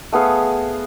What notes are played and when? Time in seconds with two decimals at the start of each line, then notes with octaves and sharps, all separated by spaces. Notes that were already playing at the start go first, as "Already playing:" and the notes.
0.12 A3 B3 G#4 F5